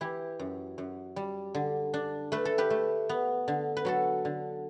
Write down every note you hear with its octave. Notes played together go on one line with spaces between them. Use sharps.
E3 E4 G4
F#2
F#2
G3
D3
D4
A3 B4
A4
G4 B4
A3
B3
D3
B4
F#3 F#4 A4
D3